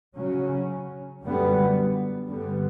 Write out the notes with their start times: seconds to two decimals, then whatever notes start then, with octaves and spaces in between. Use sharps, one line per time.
0.17 C#3 F#3 C#4
1.23 F#2 D3 G3 B3
2.29 G2 D3 G3 B3